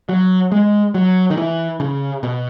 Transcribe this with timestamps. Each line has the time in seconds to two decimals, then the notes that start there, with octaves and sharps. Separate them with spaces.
0.09 F#3
0.52 G#3
0.94 F#3
1.30 D#3
1.37 E3
1.80 C#3
2.23 B2